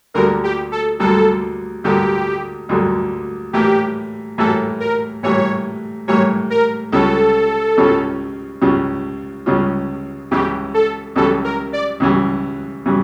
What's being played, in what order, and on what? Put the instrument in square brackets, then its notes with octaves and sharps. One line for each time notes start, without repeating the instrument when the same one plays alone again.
[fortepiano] D2 D3 G3 A#3 [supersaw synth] A#4
[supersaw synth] G4
A4
[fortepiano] D2 D3 G3 A#3 [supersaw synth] A4
[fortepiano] D2 D3 G3 A#3 [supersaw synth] G4
[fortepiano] D2 D3 G3 A#3
[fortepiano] A2 E3 G3 A#3 [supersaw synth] G4
[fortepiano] A2 E3 G3 A#3 [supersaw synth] A4
[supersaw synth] A#4
[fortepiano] A2 E3 G3 A#3 [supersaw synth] C#5
[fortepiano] A2 E3 G3 A#3 [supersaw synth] C#5
[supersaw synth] A#4
[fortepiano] C#2 C#3 G3 C#4 F4 [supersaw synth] A4
[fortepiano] C#2 C#3 G3 C#4 F4
C#2 C#3 G3 C#4 F4
C#2 C#3 G3 C#4 F4
[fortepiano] C#2 C#3 E3 G3 [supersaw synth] G4
[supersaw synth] A4
[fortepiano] C#2 C#3 E3 G3 [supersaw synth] A4
[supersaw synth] A#4
D5
[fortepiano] C#2 C#3 E3 G3
C#3 E3 G3